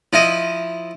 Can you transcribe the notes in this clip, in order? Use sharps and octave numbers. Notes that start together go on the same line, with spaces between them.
F3 E4 D#5